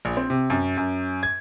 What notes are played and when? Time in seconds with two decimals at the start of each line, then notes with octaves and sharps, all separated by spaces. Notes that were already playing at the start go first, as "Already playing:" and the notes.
0.05 A#1
0.17 C4
0.30 C3
0.50 F#2
0.77 F#2
1.23 G#6